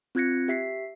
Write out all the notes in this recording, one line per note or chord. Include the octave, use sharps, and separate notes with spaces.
C4 F4 F#6 G#6 A#6 C#7
G4 E5 B6 C7